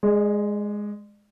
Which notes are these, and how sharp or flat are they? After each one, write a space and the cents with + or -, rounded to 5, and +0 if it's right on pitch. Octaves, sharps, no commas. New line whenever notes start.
G#3 +0 D5 +35